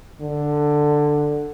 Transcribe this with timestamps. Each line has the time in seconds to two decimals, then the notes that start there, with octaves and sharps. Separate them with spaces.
0.21 D3